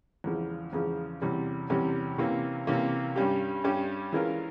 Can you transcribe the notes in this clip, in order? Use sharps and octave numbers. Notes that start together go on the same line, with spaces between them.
E2 C#3 F3 G#3
E2 C#3 F3 G#3
E2 C3 G3 C#4
E2 C3 G3 C#4
C3 E3 A#3 C#4
C3 E3 A#3 C#4
G2 G3 C#4 G4
G2 G3 C#4 G4
E3 G#3 C#4 F4 A#4